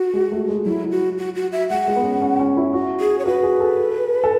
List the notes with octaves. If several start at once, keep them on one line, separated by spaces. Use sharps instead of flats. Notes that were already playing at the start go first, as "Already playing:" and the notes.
Already playing: F#4
G#3
A3
G#3
F#3 E4
F#4
F#4
F#4
E5
G#3 F#5
G#3
B3
C#4
C#4
C#4
E4
F#4
G#4
C#5
F#4 B4
G#4
A4
A4